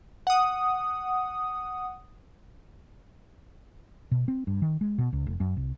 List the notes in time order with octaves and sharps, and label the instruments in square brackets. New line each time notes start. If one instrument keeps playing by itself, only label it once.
[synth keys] F#5 D#6
[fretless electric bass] B2
C4
G2
D#3
G#3
B2
C#2
F1
F#2
C2